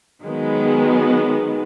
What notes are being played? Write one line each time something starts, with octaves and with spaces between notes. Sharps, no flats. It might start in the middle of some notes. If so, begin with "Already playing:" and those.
D#3 F#3 G#3 B3